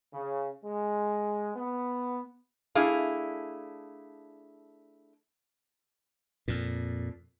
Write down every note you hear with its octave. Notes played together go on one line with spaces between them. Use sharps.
C#3
G#3
B3
A3 D4 E4 G#4 F5
F2 A#2